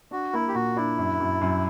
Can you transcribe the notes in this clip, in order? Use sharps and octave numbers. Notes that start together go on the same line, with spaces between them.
D4 F#4
A#3 E4
G4
A#2 F#4
D4 E4
F#2
F#2
F#2